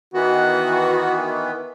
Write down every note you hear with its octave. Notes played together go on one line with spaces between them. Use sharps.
D#3 E3 B3 F#4